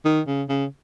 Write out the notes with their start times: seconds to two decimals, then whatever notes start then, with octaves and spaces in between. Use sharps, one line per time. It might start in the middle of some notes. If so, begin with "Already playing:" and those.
0.05 D#3
0.27 C#3
0.49 C#3